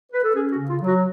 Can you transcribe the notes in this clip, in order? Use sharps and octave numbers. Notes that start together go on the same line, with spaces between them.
B4
A4
C#4 G#4
F#4
C#3
F4
F#3
F#4